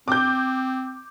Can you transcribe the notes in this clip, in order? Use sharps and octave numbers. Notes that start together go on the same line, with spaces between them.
C4 D6 G6